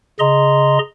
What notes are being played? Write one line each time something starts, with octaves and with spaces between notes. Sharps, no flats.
C#3 G#4 D#5 A#5 C6